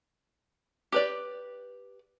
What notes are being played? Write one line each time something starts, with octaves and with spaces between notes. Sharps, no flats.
G4 B4 D5